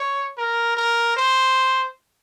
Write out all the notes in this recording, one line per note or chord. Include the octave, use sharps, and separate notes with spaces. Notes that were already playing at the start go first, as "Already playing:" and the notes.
Already playing: C#5
A#4
A#4
C5